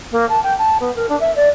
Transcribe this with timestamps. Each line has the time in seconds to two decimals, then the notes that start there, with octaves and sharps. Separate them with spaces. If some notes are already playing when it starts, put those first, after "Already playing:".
0.11 A#3
0.28 A5
0.43 G5
0.58 A5
0.80 B3
0.95 A#4
1.08 D4
1.20 E5
1.35 D5